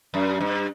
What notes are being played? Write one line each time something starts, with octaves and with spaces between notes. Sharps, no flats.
F#2
G2